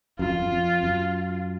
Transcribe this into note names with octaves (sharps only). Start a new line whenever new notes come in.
F#2 F4
F2
F#2
F2
F#2